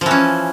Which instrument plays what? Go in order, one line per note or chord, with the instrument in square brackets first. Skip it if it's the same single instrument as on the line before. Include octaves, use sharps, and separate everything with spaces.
[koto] F3
E3
C#4